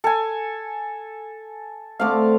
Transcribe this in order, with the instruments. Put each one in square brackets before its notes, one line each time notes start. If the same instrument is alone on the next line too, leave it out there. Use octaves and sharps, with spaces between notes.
[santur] A4 G#5
[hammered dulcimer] D3 A3 C4 [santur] F5 D6